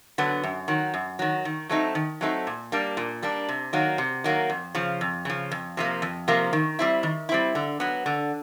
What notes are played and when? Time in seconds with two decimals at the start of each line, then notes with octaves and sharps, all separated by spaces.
0.18 D3 F#3 B3
0.43 F#2
0.68 D#3 F#3
0.94 F#2
1.19 D#3 F#3
1.45 D#3
1.69 F#3 A3 C4 D#4
1.95 D#3
2.21 F#3 A3 C4 D#4
2.47 A#2
2.72 G3 A#3 D4
2.97 A#2
3.22 G3 A#3 D4
3.49 C3
3.73 D#3 F#3 A#3
3.98 C3
4.24 D#3 F#3 A#3
4.50 F2
4.75 C#3 F3
5.01 F2
5.25 C#3 F3
5.51 F2
5.77 C3 F3 A#3
6.02 F2
6.28 C3 F3 A#3
6.53 D#3
6.79 G3 C4 E4
7.03 D#3
7.29 G3 C4 E4
7.55 D3
7.80 F#3 B3
8.06 D3